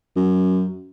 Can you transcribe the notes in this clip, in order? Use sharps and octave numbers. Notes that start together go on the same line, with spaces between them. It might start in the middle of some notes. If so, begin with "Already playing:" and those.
F#2